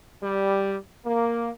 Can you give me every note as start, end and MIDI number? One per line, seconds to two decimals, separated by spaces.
0.22 0.75 55
1.05 1.49 58